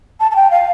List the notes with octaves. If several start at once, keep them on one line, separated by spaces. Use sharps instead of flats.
A5
A5
G5
F5